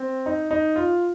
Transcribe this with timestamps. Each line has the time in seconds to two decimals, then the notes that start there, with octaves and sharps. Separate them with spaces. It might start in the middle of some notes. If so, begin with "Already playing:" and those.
Already playing: C4
0.26 D#4
0.51 D#4
0.76 F4